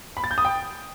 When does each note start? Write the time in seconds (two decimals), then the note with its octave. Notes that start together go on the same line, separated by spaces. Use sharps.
0.17 B5
0.24 A6
0.31 G6
0.38 D#6
0.45 G5